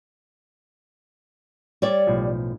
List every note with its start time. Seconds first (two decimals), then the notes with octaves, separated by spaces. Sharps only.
1.82 G3 C#5 D5
2.07 B1 A2 F3